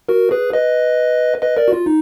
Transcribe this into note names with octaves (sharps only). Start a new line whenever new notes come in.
F#4 A#4
G#4 B4
B4 D#5
B4 D#5
A#4 D5
F#4
F4
D#4